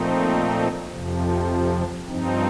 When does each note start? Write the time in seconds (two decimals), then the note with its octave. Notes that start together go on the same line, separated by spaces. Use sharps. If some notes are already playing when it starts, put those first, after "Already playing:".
Already playing: A#2 F3 A3 C4 D#4
0.90 F2 C3 F3
2.05 G2 F3 C4 D#4